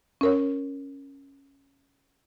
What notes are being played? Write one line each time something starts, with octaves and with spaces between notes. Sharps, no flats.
C#4 A#4 C#5